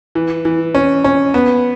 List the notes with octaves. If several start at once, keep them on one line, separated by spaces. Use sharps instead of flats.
E3
E3
C#4
C#4
B3